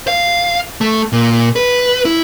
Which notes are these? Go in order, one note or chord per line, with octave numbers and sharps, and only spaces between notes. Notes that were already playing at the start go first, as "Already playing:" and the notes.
F5
A3
A#2
B4
E4